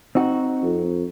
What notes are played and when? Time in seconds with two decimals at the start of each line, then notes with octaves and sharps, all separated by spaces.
0.15 C4 D#4 F#4
0.63 F2